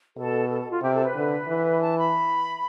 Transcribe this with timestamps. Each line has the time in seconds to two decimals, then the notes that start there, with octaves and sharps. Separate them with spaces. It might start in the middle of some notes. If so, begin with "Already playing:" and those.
0.17 B2 A4
0.49 A4
0.60 A4
0.71 F4
0.82 C3 G4
0.94 A4
1.04 B4
1.15 D3
1.48 E3
1.81 A5
1.98 B5